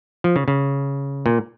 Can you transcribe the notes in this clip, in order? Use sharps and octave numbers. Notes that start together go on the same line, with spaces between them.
F3
C#3
C#3
A#2